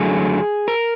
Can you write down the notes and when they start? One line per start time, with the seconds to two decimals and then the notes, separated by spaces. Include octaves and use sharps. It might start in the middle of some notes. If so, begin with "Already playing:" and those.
Already playing: F#2 D3 F#3 A3 G#4
0.68 A#4